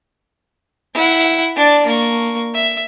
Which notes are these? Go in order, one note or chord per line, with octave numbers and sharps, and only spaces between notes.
E4 F#5
D4 D5
A#3 C#6
E5